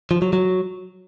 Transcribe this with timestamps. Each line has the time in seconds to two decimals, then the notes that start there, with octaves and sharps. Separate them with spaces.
0.11 F3
0.22 F#3
0.33 F#3